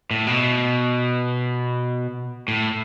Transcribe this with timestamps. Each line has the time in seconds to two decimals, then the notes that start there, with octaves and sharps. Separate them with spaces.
0.11 A2
0.27 B2
2.48 A2